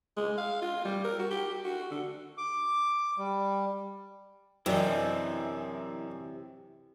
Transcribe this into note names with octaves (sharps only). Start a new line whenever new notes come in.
G#3
F5
F4
G3
A#4
F#4
G4
G4
F#4
D3
D6
G3
F#2 C3 E3 G3 D4 E4 D5 D#5